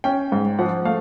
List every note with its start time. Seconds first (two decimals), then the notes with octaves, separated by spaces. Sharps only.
0.04 C#4 G5
0.32 G#2
0.59 F3 F#5
0.85 A3 F5